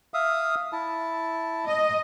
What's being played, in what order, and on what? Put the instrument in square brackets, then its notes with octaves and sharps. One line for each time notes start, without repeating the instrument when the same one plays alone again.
[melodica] E5 F5 D#6
E4 A5
[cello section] D#5